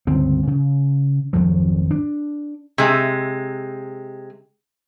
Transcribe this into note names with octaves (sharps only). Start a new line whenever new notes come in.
G1 C#2 C4
C#3
G#1 F2 F3 F#3
D4
C3 G#3